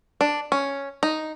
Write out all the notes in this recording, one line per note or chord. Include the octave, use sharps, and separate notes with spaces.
D4
C#4
D#4